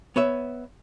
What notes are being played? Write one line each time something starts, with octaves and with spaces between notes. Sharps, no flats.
B3 C#5 E5